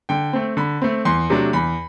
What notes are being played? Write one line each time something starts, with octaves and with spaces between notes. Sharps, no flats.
D3 G5
A3 C4
D3 B5
A3 C4
E2 C6
C3 F#3 A3 D4
E2 B5